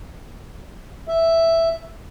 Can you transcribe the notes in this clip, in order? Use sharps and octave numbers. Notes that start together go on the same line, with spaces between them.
E5